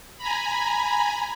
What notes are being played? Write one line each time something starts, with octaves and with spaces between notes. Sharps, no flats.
G#5 A#5 B5